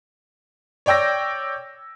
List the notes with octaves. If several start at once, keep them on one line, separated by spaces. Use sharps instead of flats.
C#5 D5 G5 E6 A#6